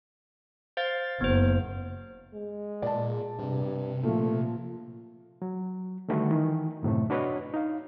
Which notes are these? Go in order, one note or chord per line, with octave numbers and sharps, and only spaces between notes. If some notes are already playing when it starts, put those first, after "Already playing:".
C5 F5 A6
F#1 B3 C5
G#3
A#2 D5 A5
G2 C3
A#2 F3 A3
F#3
D3 D#3 G3 A3 F#4 B4
D#3 E3
F#2 A2 C3 A3
D4 F#4 B4 C#5 D#5
D#4 F5